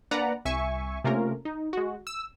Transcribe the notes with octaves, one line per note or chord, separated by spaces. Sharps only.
A#3 D4 B4 D5 F#5 A#5
C2 E5 G#5 C#6
C3 A3 A#3 C#4 F4 A#4
D#4
G#3 F#4
E6